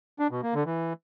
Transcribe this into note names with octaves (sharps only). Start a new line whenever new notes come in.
D4
B2
A#3
D3
E3